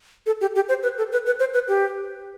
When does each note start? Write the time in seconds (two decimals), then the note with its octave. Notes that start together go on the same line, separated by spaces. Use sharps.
0.26 A4
0.41 G4
0.55 G4
0.69 C5
0.83 B4
0.98 A4
1.12 B4
1.26 B4
1.40 C5
1.54 B4
1.68 G4